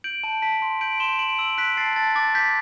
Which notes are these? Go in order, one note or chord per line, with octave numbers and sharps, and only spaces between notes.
G6 D7 F#7
A5
A5 B6 D7
C6
G6 D7 F#7
C6 E7 G7
C6 D7 F#7
E6 D7 F#7
F#6 B6 D7
A5 A6 C7
A5 A6
D6 A6
G6 B6